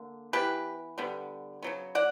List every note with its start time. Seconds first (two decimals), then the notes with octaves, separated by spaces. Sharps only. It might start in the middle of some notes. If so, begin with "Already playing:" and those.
Already playing: D3 A#3
0.33 E3 B3 G4 B4
0.98 D3 G3 B3
1.63 C#3 F#3 B3
1.95 D5 F#5